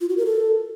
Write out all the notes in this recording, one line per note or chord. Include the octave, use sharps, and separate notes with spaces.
F4
F#4
A#4
A4